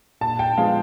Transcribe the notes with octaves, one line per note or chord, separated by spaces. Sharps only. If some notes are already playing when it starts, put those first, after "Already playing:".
A#2 A5
G5
F3 G#3 B3 F5